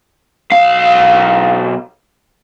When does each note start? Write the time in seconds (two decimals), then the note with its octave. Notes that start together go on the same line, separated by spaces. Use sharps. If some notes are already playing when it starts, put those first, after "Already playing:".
0.52 B1 F5